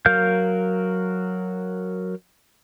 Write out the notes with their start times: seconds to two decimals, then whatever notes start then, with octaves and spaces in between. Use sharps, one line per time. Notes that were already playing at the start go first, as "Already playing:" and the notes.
0.06 F#3 A#4 F5 F6 G6